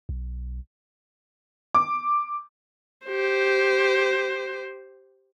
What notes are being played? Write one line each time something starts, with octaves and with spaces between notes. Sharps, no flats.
B1
D6
G4 C5